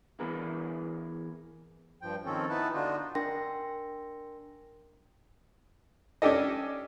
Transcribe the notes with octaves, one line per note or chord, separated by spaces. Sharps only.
E3 B3 G#4 A#4
G2 F3 G5
D#3 F3 C4 C#4 A4
B3 D#4 E4 B4 A5
D3 B3 D4 D#4 F4 F#4
D4 A#4 G5 C6 A#6
C#4 D4 G4 A4 D#5